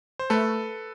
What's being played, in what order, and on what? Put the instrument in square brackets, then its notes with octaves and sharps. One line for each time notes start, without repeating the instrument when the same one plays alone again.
[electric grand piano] C5
[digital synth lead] A3 [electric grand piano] A4 B4